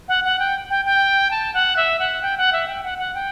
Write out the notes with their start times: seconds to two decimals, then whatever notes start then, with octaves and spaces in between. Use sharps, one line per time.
0.08 F#5
0.24 F#5
0.39 G5
0.70 G5
0.85 G5
1.31 A5
1.54 F#5
1.77 E5
1.99 F#5
2.22 G5
2.38 F#5
2.53 E5
2.68 G5
2.84 F#5
2.98 F#5
3.15 G5